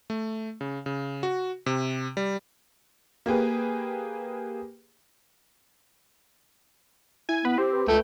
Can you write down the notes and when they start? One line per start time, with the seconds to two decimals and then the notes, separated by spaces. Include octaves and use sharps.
0.10 A3
0.61 C#3
0.86 C#3
1.23 F#4
1.66 C3
2.17 G3
3.26 A#3 G4 G#4 B4
7.29 E4 G#5
7.45 B3 B4
7.58 C4 G4
7.73 B4
7.88 C#2 A3 G5